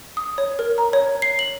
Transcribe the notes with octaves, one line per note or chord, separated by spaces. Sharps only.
D#6
C#5
A#4
A#5
C#5
C7
F#7